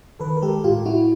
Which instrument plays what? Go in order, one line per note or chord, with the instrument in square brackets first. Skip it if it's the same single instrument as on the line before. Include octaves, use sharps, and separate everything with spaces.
[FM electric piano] D#3 A4 B4
A#4
G#3 G4 A4
A2 F4 G4
F#3 E4 F#4